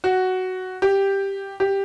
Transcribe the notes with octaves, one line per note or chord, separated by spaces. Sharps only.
F#4
G4
G4